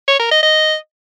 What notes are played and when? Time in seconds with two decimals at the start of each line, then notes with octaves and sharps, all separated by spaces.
0.08 C#5
0.20 A#4
0.31 D#5
0.43 D#5